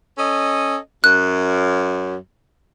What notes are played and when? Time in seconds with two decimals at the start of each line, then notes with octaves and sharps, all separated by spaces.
0.18 C#4 A4 D#5
1.04 F#2 F#6